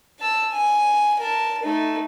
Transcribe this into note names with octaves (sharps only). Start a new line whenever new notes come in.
A5 E6
G#5
A#4 A5
A3 D#4